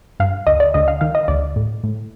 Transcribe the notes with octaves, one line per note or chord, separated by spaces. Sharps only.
G2 F5
D2 D#5
D5
D2 D#5
F5
D#3 F5
D#5
D2 D5
A2
A2